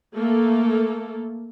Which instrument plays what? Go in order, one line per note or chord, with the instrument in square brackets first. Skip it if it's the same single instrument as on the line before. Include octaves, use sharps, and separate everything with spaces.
[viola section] A3 A#3 A4